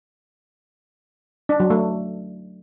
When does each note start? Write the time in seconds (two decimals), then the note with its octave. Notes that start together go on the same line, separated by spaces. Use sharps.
1.49 D4
1.60 F#3
1.70 A3